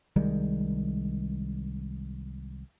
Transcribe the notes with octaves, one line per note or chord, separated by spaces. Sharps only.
C2 D#3 G3 G#3